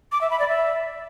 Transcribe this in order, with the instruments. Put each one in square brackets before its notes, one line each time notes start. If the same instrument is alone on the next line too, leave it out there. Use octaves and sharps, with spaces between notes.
[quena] D6
E5
B5
D5
E5